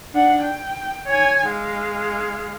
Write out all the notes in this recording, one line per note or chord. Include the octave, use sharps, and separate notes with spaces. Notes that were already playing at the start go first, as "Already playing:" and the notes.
D4 F#5
G5
C#5 G#5
G#3 F5